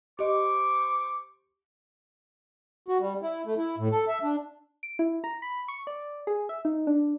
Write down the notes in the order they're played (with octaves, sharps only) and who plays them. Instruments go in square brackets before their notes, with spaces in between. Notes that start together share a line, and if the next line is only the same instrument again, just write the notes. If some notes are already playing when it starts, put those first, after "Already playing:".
[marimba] G4 D#5 [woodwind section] C5 C#6 D6
[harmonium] F#4
G3
E4
A3
E4
A2
A4
E5
D4
[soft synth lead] D7
E4
A#5
B5
C#6
D5
G#4
E5
D#4
D4